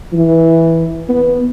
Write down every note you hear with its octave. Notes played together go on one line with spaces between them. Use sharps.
E3
B3